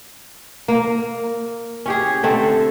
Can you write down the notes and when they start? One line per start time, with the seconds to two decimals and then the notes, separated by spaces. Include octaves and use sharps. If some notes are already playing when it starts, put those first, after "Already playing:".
0.68 A#3
1.86 C#4 G4 G#4
2.23 D3 A3 C4